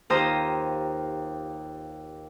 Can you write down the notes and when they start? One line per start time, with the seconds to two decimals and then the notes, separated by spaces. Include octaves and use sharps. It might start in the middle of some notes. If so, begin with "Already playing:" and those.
0.10 D#2 F4 G4 C5 A#5 D#6